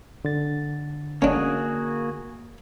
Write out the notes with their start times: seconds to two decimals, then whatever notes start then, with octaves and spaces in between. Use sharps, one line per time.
0.25 D3 A6
1.22 A#3 C#4 D4 F#4 G#4